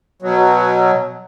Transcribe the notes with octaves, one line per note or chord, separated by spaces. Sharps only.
B2 F#3